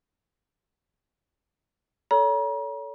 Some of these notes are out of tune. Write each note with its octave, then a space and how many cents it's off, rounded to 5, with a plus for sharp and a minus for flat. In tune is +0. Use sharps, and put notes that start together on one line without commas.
A4 +0 C#5 +30 A#5 +40